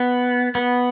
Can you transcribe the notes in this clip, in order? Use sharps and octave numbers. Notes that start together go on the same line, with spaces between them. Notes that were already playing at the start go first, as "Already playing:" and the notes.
Already playing: B3
B3